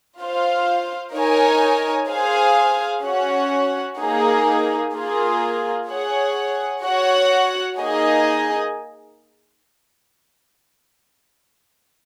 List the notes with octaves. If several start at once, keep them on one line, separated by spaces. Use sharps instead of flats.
F4 C5 F5
D#4 A#4 C#5 G#5
G#4 C5 F5 G#5
C#4 F#4 C#5 F#5
A#3 D#4 G#4
A#3 F4 G#4
G#4 C#5 F#5
F#4 C#5 F#5
A#3 D#4 G#4 D#5 G#5